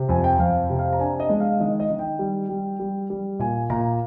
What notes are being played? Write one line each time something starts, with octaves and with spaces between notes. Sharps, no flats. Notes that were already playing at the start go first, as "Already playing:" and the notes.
Already playing: C3
F2 G#5
G5
F2 F5
C3
F5
A#5
D4 G#5
D#5
G#3
F5
D#3 D#5
D#5
D#3
G5
G3
G3
G3
G3
A#2 G#5
A#2 A#5